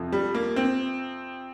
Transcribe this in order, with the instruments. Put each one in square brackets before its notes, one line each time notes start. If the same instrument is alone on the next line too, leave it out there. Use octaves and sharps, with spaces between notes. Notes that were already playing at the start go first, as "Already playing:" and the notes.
Already playing: [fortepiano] F2 C3 F3
[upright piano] G3
A#3
C4